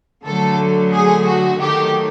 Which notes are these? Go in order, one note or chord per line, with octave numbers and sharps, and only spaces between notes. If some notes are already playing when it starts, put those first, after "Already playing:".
D3 F#3 A3 A4
G#4
F#4
D#3 F#3 A3 G4